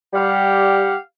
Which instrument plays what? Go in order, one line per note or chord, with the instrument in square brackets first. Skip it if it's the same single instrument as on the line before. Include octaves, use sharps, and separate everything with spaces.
[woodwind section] G3 [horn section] G4 F5 F#5